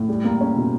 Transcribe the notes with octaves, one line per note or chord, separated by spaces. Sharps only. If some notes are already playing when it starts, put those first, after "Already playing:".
Already playing: A2
G3
A#3
C#4
B2